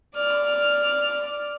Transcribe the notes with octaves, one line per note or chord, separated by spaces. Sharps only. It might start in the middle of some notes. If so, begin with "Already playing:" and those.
D5 F6